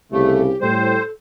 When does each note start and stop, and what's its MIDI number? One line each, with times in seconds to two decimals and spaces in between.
0.12 0.50 36
0.12 0.50 49
0.12 0.42 57
0.12 0.61 67
0.61 0.96 45
0.61 0.96 55
0.61 1.11 69
0.61 1.02 72